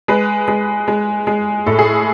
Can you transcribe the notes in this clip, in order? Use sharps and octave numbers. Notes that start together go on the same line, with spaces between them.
G#3 B4
G#3
G#3
G#3
A2 A4
G#4